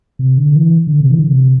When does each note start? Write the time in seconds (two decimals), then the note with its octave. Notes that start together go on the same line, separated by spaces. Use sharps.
0.19 C3
0.38 D3
0.56 E3
0.87 D3
1.00 C3
1.11 E3
1.18 D3
1.27 C3